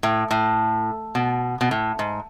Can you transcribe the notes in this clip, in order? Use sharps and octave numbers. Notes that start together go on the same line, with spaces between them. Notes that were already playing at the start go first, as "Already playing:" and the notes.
A2
A2
B2
B2
A2
G#2